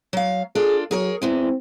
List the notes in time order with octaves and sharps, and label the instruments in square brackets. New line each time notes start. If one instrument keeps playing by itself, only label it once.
[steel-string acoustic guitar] F#3 F5
[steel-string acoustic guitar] D4 F4 A4 [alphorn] G#4
[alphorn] F#3 [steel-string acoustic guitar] G#4 A#4 C#5
[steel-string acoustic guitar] E2 E3 G#3 [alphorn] C4